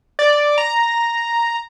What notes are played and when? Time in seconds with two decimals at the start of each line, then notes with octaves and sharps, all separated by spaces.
0.19 D5
0.58 A#5